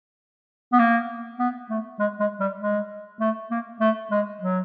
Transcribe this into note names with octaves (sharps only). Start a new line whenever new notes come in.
B3
A#3
B3
A3
G#3
G#3
G3
G#3
A3
A#3
A3
G#3
F#3